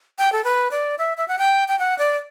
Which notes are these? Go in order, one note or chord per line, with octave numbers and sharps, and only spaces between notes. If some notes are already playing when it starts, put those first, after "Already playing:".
G5
A4
B4
D5
E5
E5
F#5
G5
G5
F#5
D5